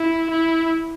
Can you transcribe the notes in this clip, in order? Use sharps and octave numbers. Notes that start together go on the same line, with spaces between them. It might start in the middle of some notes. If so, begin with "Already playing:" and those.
Already playing: E4
E4